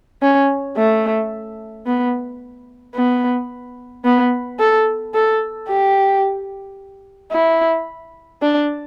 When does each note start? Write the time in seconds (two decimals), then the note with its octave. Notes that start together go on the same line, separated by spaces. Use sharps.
0.22 C#4
0.77 A3
1.86 B3
2.95 B3
4.05 B3
4.59 A4
5.14 A4
5.68 G4
7.32 E4
8.42 D4